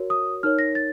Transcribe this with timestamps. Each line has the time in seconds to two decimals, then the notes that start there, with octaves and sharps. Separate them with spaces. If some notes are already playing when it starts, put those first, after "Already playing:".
Already playing: F#4 A#4 C#5
0.10 D#6
0.43 D#4 A#4 C#5 F6
0.59 A#6
0.75 A6